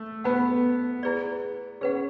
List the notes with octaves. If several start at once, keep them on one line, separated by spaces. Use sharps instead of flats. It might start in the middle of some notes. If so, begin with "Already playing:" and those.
Already playing: A3
B3 B4 F#5 A5
E4 G#4 B4 D5
C#4 G#4 B4 F#5